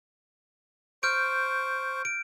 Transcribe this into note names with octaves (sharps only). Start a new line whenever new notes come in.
C5 C#6 F6 G6 D7
D7